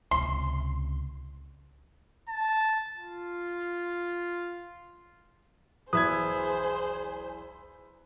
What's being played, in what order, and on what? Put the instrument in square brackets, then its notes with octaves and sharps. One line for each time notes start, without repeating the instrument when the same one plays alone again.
[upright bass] C#2 C3 [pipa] C6
[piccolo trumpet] A5
F4
[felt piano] B1 E2 [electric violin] G#4 C5 [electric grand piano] B4 E5 G#6 [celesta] D#6